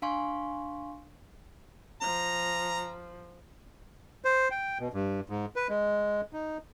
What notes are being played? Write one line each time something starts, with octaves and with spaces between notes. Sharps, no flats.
D4 F5 G#5 C6 C#6
F3 A#5
C5
G5
B2
G2
G#2
B4
G#3
D#4